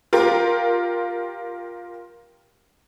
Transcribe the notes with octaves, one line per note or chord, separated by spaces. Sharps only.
F4 G4 A#4